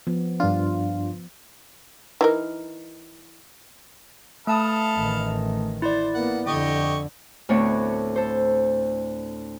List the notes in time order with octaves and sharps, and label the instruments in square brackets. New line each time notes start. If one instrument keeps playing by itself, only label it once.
[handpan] F3 B3
[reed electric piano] G2 D4 [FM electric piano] F4
[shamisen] E3 D#4 A#4
[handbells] A3 A5 D#6 [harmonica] A4 B4 F5
[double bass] A1 D#3
[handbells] E4 D5 [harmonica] C5
[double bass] A#3 B3 [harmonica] F#5
[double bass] F2 D3 [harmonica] G4 D#5 C#6
[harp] D2 A2 B3 C4 D4 C#5
A4 C5